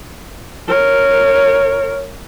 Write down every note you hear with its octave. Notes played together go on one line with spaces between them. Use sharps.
A#4 C#5